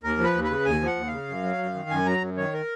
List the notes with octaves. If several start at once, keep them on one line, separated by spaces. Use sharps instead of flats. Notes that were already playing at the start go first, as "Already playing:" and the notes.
D#2 A#4
F3
B4
D#2
B4
C#3
D#2 G#5
F3
F#5
D#2
C#3 F5
F#2
F#3
F#2
D#3
F#2 G#5
F#3 A#5
F#2
D#3 C#5
A#4